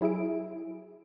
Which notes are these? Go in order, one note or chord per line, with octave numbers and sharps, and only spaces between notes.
F#3 E4 G#4 E5 D7